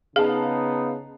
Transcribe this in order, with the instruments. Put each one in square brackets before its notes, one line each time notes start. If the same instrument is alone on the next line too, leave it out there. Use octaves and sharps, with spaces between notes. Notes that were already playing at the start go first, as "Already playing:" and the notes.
[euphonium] C#3 [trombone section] B3 D#4 [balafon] G#4 [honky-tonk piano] F5 A5